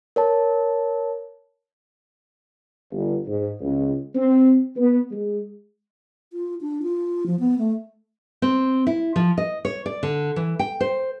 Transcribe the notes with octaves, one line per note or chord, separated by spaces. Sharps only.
A#4 C#5 A5
G1
G#2
C#2
C4
B3
G#3
F4
D4
F4
F3
B3
A3
C4
E4
F3
D#5
C#5
D5
D3
E3
G5
C5